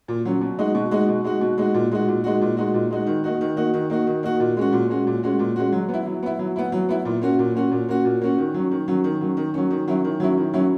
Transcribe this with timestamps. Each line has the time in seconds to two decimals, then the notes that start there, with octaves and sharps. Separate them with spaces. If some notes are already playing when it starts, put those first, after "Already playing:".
0.08 A#2
0.25 F#3 C#4
0.41 B2
0.59 G#3 D#4 F#4
0.75 B2
0.91 G#3 D#4 F#4
1.08 B2
1.24 G#3 D#4 F#4
1.41 B2
1.58 G#3 D#4 F#4
1.74 A#2
1.91 G#3 D#4 F#4
2.08 A#2
2.24 G#3 D#4 F#4
2.41 A#2
2.57 G#3 D#4 F#4
2.74 A#2
2.91 G#3 D#4 F#4
3.07 D#3
3.24 A#3 D#4 F#4
3.41 D#3
3.57 A#3 D#4 F#4
3.74 D#3
3.90 A#3 D#4 F#4
4.07 D#3
4.23 A#3 D#4 F#4
4.40 A#2
4.57 G#3 C#4 F#4
4.73 A#2
4.90 G#3 C#4 F#4
5.07 A#2
5.23 G#3 C#4 F#4
5.39 A#2
5.56 G#3 C#4 F#4
5.72 F#3
5.89 B3
5.94 E4
6.06 F#3
6.23 B3 E4
6.39 F#3
6.56 B3 E4
6.72 F#3
6.89 B3 E4
7.05 A#2
7.22 A#3 C#4 F#4
7.39 A#2
7.55 A#3 C#4 F#4
7.72 A#2
7.89 A#3 C#4 F#4
8.05 A#2
8.22 A#3 C#4 F#4
8.38 D#3
8.54 F#3 C#4
8.71 D#3
8.88 F#3 C#4
9.04 D#3
9.21 F#3 C#4
9.37 D#3
9.54 F#3 C#4
9.71 D#3
9.88 F#3 C#4 E4
10.04 D#3
10.20 F#3 C#4 E4
10.38 D#3
10.54 F#3 C#4 E4